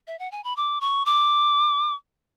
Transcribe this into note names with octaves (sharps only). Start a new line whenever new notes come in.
E5
F#5
G#5
B5
D6
C#6
D6